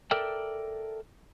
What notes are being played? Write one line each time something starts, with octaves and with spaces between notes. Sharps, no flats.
A4 A#4 D5 E5 G5